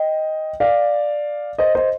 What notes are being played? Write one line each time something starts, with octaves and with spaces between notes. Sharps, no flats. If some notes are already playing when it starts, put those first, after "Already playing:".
Already playing: D#5 G5
D5 F5
C5 D#5
C5 D#5